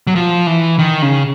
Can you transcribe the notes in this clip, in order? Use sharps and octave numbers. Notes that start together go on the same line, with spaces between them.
F#3
F3
E3
D#3
C#3